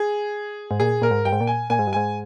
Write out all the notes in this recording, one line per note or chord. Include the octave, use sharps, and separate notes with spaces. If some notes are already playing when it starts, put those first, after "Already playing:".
Already playing: G#4
G#2
A#2 G#4
A#2 A#4
G#2
G2 G5
G#2
A#2
G#5
A#2 G#5
G#2
G2
G#2 G#5